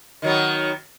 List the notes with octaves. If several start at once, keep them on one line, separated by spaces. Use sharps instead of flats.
D#3 F#3 B3